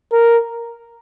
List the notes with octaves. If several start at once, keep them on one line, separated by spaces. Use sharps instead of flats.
A#4